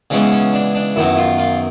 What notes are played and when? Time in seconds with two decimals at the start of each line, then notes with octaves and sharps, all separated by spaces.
0.10 C#3 E3 G#3 B3 C#4
0.32 C#4
0.53 D4
0.75 D4
0.96 F#2 D#3 F#3 B3 E4
1.17 F4
1.38 F4